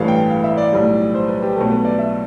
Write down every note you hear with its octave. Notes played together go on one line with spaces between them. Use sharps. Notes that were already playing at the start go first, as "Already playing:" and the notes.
Already playing: A1 G2 E3 A3 F5
G5
F5
E5
D5
B1 A2 G3
C5
B4
G4
B1 B2 A3 A4
B4
D5
E5